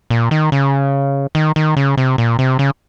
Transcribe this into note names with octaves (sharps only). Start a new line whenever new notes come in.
A#2
D#3
C#3
D#3
D#3
C#3
C3
A#2
C3
C#3